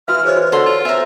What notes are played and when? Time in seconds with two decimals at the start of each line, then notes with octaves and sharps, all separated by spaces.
0.08 E3 F#4 F5 F6
0.25 G#4 C5 C#5 D#5
0.36 F#4 B4
0.52 D3 A4 C6
0.66 F4
0.85 C5 E5 G#5 A#5